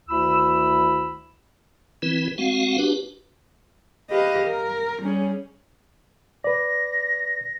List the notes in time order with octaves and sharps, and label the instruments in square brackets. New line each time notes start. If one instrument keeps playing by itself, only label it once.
[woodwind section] D2 D#3 E4 B5 E6
[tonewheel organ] E3 C4 E4 B4
G#3 C4 F#4 F5 F#5
D4 F#4 G4 B4
[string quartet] G4 B4 D#5 F5
A#4
G3 C#4 G#4
[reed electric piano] B4 D5 [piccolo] A#6